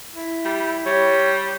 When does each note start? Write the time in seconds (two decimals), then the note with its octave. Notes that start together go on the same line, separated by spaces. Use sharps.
0.15 E4
0.45 G3
0.86 G3 C#5